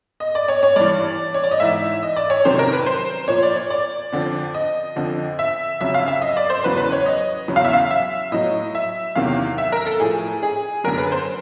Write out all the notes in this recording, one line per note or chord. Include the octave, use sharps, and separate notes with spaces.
D#5
D5
C#5
C#5
G2 E3 D5
C#5
D5
D#5
G#2 E3 E5
D#5
D5
C#5
F2 C3 D#3 F#3 C5
A#4
B4
C5
A#2 F3 C#5
D5
C#5
D5
F2 D3 F3
D#5
F2 D3 F3
E5
F2 C#3 F#3 E5
F5
E5
D#5
D5
C5
E2 C#3 F#3 B4
B4
C#5
D#5
E2 C#3 F#3
F5
E5
F5
E5
A2 F#3 D#5
E5
E2 C3 D#3 F#3 F5
E5
A#4
A4
A2 F3 G#4
G#4
F#2 D3 F#3 A#4
B4
C5